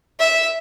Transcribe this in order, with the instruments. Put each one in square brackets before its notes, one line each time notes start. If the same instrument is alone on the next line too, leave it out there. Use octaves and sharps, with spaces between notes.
[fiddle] E5